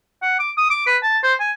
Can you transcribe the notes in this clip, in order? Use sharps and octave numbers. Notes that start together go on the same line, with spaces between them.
F#5
D6
D#6
D6
B4
A5
C5
G#5